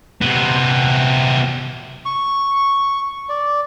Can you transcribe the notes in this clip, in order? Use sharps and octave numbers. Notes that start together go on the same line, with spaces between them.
C3 B3
C#6
D5